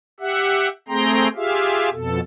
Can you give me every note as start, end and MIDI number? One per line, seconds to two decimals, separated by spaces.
0.20 0.69 67
0.20 0.69 76
0.20 0.69 78
0.88 1.28 57
0.88 1.28 60
0.88 1.28 68
0.88 1.28 79
0.88 1.28 82
0.88 1.28 84
1.36 1.90 65
1.36 1.90 67
1.36 1.90 68
1.36 1.90 76
1.36 1.90 77
1.93 2.20 41
1.93 2.20 47
1.93 2.20 69